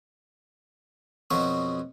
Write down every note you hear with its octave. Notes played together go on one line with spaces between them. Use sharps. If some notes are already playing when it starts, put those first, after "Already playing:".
F2 B2 F3 F#3 C#5